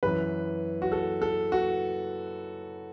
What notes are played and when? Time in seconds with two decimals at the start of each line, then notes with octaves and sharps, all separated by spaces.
0.03 F#2 E3 B4
0.82 F#4
0.92 A4
1.22 A4
1.52 F#4